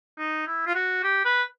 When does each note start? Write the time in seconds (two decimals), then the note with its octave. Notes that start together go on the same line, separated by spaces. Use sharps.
0.18 D#4
0.47 E4
0.67 F4
0.75 F#4
1.04 G4
1.25 B4